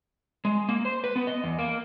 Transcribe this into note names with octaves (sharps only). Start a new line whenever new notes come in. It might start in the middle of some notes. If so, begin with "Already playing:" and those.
G#3
A#3
C5
B4
B3
D#5
E2
A#3